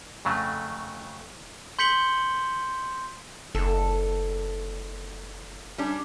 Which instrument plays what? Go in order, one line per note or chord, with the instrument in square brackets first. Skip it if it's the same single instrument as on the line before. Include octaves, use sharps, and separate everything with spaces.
[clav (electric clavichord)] F2 C#3 F#3 A3
[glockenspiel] C6 G6 B6 C#7 F#7 G7
[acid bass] F#1 [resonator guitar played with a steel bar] A4
[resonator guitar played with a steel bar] G3 C#4 D4